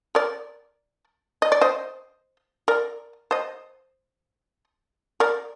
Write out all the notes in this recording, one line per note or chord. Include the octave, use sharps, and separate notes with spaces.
A#4 D5
D#5
D5
C5 D#5
A#4 D5
C5 D#5
A#4 D5